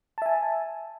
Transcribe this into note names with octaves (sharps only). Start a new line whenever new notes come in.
E5 G#5 A5